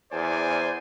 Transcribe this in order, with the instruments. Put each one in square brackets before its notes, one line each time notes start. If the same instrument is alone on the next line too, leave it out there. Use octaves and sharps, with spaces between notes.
[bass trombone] E2 [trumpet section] C5 D5 G#5